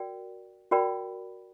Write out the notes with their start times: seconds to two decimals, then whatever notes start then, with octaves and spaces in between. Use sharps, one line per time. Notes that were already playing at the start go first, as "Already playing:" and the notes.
Already playing: F#4 A#4 D5 G5
0.71 F#4 A#4 D5 G5 B5